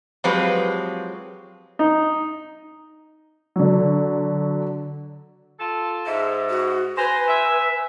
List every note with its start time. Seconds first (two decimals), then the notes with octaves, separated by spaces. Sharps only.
0.24 F3 F#3 G#3 C4 G4 B4
1.79 D#4
3.56 D3 F#3
5.60 F4 A4 A5
6.06 G#2 E5
6.50 F#4
6.98 B4 C5 G#5 A#5
7.28 E5